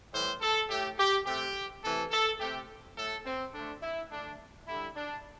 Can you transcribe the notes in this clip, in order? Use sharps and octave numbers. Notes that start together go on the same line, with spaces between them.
A2 E3 G3 C5
A4
A2 A3 G4
G4
C3 A3 G4
C3 E3 A3 A4
A4
C3 A3 G4
A2 A3 A4
C4
D3 A3 D4
E4
D3 A3 D4
D3 G3 E4
D4